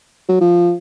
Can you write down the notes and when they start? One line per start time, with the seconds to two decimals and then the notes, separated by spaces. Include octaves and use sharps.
0.29 F#3
0.41 F3